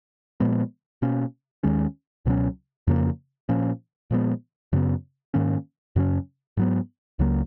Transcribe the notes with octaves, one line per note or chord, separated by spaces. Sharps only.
A#2 F3 G#3 B3
B2 A#3 C#4
D#2 D#3 G#3 C#4
C#2 B2 F#3 C#4
F2 C#3 F3 A#3
A#2 F3 A#3 C#4
A#2 F3 G#3 B3
F#2 C#3 F#3 B3
G#2 D#3 A#3 C#4
F#2 C#3 F#3 C#4
G#2 F#3 B3
C#2 C#3 F#3 A#3